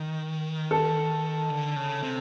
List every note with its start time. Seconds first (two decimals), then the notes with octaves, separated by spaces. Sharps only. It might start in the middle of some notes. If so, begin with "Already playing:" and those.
Already playing: D#3
0.71 A4
1.50 D3
1.76 C#3
2.03 C3